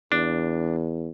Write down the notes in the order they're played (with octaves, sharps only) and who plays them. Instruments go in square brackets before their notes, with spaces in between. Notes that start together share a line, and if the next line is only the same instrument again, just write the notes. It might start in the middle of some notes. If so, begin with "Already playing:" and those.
[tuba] E2 [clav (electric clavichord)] D4